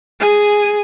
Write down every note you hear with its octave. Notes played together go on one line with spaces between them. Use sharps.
G#4 G#5